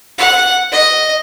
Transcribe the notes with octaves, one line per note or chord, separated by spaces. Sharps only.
F#5
D#5